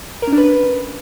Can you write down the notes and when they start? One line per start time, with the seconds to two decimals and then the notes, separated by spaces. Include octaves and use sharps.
0.22 A#4
0.27 C#4
0.32 D4
0.38 B4